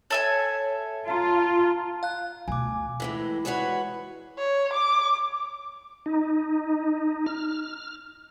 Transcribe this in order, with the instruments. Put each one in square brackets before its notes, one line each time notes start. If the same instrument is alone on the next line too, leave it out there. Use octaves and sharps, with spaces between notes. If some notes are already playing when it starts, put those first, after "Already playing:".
[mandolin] A4 E5 G#5 [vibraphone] C#5
[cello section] F4 [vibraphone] A5 A#5
[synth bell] F5 F#6
[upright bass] D2 B2 [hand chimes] G#5 D6
[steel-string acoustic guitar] A2 E3 G#3
G#3 F#4 G#4 B4 C#5
[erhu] C#5
D6
[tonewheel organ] D#4
F6